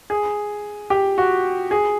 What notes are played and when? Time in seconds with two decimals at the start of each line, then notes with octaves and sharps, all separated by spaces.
0.10 G#4
0.90 G4
1.18 F#4
1.71 G#4